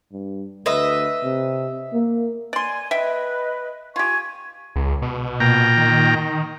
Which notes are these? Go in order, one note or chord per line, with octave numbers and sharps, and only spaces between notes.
G2
D2 B4 D#5 E5
C3
A#3
D5 G#5 C6
B4 D#5 E5 G5
F4 G4 G#5 C#6 G#6
C#2
B2
A#2 G5 A#5
D#3